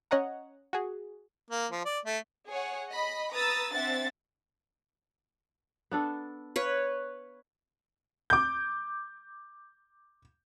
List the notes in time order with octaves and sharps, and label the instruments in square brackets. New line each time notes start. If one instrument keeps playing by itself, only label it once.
[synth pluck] C#4 C#5 D#5 F#5 A#5
F#4 G#4
[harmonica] A#3
F3
D5
A3
[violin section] G#4 C#5 F#5
D#5 B5
B4 A#5 D#6 E6 A6
C4 D4 E5 F#5 A6
[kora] B3 D4 A4
[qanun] B4 C#5 [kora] F5
[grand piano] D6 G6